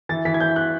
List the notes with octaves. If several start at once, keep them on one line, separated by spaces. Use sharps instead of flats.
E3 A6
E3 B6
G#6
E3 G6
F#6